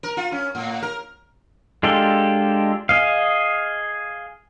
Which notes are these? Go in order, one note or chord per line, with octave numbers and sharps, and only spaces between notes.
A#4
F4
C#4
A2
A#4
G#3 D4 F4 G4 A4
G#4 D#5 F5